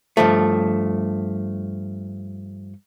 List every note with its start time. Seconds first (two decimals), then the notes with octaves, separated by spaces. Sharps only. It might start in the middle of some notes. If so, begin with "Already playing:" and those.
0.17 G2 F3 A3